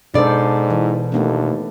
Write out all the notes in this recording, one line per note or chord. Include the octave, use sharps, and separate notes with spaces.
G#2 B2 D4 A4 C5 D5
E3
D#2 A3 B3 D4